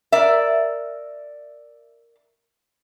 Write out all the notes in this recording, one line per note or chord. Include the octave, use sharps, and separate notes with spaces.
A#4 D5 E5